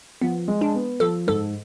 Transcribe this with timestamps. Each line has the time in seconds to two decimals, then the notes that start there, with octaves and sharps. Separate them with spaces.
0.22 F3 B3
0.48 G#3
0.61 D4
0.75 B3
1.00 F3 A4
1.27 G#2 A4